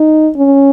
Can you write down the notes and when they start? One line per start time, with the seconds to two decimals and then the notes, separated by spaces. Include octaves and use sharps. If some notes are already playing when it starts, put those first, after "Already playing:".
Already playing: D#4
0.36 C#4